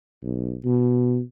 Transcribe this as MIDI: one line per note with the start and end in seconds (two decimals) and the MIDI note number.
0.23 0.57 35
0.65 1.20 47